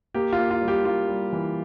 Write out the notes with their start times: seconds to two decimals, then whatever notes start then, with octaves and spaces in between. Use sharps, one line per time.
0.14 A#3 G4
0.33 F4
0.39 A#3
0.51 F4
0.62 G3
0.68 G4
0.85 A#3 F4
1.09 G3
1.32 E3